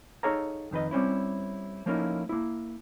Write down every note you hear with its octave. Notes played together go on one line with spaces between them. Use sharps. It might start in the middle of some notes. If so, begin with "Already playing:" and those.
D#4 G#4 A4 C#5 F5 A#5
F2 D#3 B4 D#5
G3 C4 C#4 E4
F3 A3 A#3 C#4 D#4 E4
A#3 E4